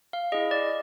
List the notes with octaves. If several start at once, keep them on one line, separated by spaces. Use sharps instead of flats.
F5
E4 G#4 D#5
D5